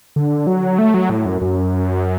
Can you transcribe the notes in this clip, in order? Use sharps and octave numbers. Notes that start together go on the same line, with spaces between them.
D3
F#3
A3
F#3
A2
F#2
F#2